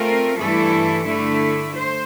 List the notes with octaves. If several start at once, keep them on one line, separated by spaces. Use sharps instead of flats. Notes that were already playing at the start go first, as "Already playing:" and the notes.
Already playing: A3 C4 F4 A#4
G2 E3 A3 E4 A4
D3 A3 E4
C5